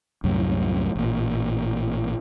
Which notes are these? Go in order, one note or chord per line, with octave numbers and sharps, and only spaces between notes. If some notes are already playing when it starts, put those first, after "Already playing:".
C2 F#2 A2
A1 A#2